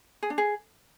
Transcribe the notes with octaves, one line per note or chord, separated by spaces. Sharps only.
G#4
D4
G#4